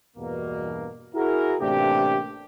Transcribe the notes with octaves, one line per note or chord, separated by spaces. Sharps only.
E2 G2 B2 A#3
E4 F#4 G#4 A#4
A1 C3 A3 A#3 D4 G4